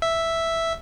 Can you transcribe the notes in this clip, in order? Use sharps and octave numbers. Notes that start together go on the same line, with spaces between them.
E5